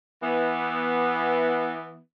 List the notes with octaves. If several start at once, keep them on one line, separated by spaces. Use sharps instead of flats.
E3 B3